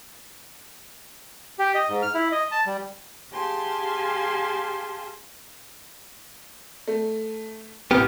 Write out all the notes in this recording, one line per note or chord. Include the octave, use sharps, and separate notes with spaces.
G4
D#5
G#2
F6
E4
D#5
A5
G3
G4 G#4 F5 G#5 A5 C6
A3
A1 C3 B3 G4 F6